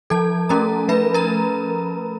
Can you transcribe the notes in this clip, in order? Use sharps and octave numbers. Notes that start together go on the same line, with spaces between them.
F3 A4 A5
A3 C#4 A#4 A#5
F3 B4 B5
A#4 A#5